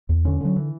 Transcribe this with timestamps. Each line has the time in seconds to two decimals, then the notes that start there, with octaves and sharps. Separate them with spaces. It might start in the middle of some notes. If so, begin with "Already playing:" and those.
0.09 E2
0.25 D3 C#4
0.40 D3 F#3
0.56 E3